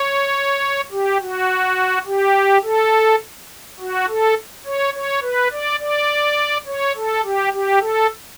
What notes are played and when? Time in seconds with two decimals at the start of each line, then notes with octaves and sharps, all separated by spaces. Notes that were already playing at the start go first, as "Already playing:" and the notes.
Already playing: C#5
0.92 G4
1.21 F#4
2.06 G4
2.64 A4
3.80 F#4
4.08 A4
4.66 C#5
4.94 C#5
5.22 B4
5.51 D5
5.80 D5
6.67 C#5
6.95 A4
7.24 G4
7.53 G4
7.81 A4